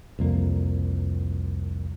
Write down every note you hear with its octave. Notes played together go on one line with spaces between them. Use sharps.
C2 F2 A#3